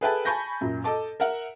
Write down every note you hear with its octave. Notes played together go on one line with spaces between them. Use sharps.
G#4 A4 B4 E5 G5 A5
G#5 A5 B5 C#6 G6 A#6
F#2 A#2
A4 D#5 A5 D6
A#4 E5 F#5